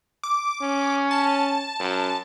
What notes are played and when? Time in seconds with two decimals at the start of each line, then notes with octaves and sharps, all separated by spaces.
0.23 D6
0.62 C#4
1.11 A5
1.79 F#2